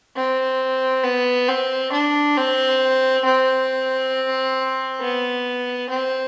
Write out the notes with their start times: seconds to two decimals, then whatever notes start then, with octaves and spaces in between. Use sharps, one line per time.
0.16 C4
1.04 B3
1.49 C4
1.92 D4
2.37 C4
3.25 C4
5.01 B3
5.90 C4